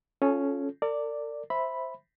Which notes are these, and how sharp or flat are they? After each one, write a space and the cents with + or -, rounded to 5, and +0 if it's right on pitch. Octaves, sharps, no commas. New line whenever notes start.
C#4 +0 F4 +0 A4 -25
A#4 -45 D5 +0
C5 +0 E5 +0 B5 +0